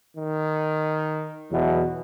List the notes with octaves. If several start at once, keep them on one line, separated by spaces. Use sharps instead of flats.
D#3
E2 B2 F#3